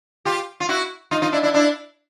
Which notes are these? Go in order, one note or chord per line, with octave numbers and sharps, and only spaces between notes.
F4 G4
F4
E4 F#4
D#4 F4
D#4 F4
D4 E4
D4 E4
D4 E4